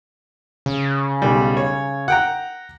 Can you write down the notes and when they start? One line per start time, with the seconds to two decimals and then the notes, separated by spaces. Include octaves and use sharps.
0.66 C#3
1.22 B1 G3
1.57 C#5
2.08 F#5 G5 A#5